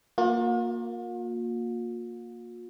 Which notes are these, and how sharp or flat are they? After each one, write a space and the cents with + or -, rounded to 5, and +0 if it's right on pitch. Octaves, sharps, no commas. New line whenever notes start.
A#3 +0 F4 +45